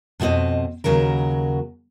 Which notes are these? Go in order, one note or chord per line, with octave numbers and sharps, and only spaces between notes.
F2 B2 F#3 C4 D#5
D#2 C#3 F#3 F#4 A#4